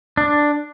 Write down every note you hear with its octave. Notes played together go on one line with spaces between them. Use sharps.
D4